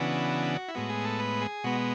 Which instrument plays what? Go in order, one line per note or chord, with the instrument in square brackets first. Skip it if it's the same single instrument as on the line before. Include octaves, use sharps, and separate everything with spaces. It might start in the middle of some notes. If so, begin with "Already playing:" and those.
Already playing: [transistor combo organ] C#3 E3 B3 D4 F#4
E4
A2 G#3 B3 F#4
G#4
A4
B4
G#4
B2 G#3 B3 F#4